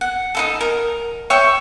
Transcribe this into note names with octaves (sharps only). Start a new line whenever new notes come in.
F#5
D#4 E4 A4
A#4
C#5 E5 G5 C#6